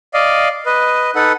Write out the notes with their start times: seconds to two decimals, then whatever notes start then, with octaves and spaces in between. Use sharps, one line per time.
0.14 D5 D#5 F5
0.66 B4 D#5
1.15 D#4 A4 B4 F#5